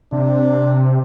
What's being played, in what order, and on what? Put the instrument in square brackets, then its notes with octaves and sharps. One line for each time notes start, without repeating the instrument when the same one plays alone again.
[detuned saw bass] C3 [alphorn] D4